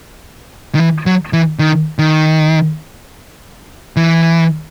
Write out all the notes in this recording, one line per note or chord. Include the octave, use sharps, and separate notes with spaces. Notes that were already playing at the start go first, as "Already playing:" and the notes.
D#3
E3
F#3
E3
D#3
D#3
E3